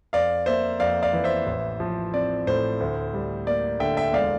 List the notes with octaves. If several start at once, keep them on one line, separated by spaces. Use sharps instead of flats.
F2 D5 F5
A#3 C5 E5
F2 D5 F5
D5 F5
E3
C5 E5
A1
F3
C4 D5
A2 C5
D2
G3
A#3 D5
D3 E5 G5
E5 G5
E1 D5 F5